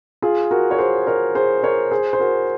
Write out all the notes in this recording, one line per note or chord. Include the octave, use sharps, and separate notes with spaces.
F4 G#4
F#4 A#4
C#5
G#4 C5
A#4 C#5
G#4 C5
A#4 C#5
G#4 C5
C5
F#4 A#4